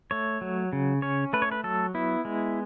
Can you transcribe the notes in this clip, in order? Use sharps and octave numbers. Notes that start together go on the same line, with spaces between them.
A3 C#5
F#3
C#3
C#4 C#5
A3 B4
C#5
B4
F#3 A4
B3 E4
G#3